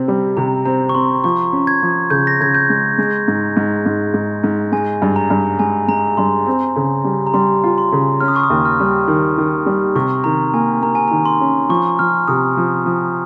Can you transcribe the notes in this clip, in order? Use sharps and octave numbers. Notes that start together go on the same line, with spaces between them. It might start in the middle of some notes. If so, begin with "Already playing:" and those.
Already playing: C3 C4
G3
C3 A#5
C4 A#5
C#6
C4 C6
F3 C#6
C#4
G#6
F3
C#3 G6
A#6
C#3 G#6
G6
G#3
G#3
G#2
G#2
G#2
G#2
G#2
G#3 G#5
G2
A#5
G2
G#3 G#5
G#3 A#5
G2 C6
C4
C#3
G3
A#5
G3 C6
F4
C6
C#3
C#4 F6
D#6
C#6
D#6
D#2
F6
G3
D#3
D#3
G3
C3 C#6
D#3 A#5
A#3 G#5
A#3 A#5
G#5
A#5
D#3
C6
C#4
F3 C#6
F3 F6
C3 D#6
F3
F3